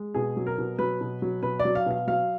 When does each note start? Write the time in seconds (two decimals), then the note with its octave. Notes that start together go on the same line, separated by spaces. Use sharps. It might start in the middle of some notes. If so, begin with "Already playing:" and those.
Already playing: G#3
0.14 B2 G#4
0.37 F#3
0.47 A#4
0.58 B2
0.79 F#3 B4
1.01 B2
1.22 F#3
1.43 B2 B4
1.60 D5
1.65 F#3
1.75 F5
1.86 B2 F5
2.07 F#3 F5